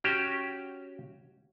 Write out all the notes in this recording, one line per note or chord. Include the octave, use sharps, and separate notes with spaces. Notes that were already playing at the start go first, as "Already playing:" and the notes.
C#4 F#4 G4